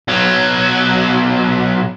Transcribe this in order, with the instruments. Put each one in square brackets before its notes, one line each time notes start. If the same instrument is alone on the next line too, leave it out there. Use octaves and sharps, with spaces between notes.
[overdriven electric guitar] B1 F#3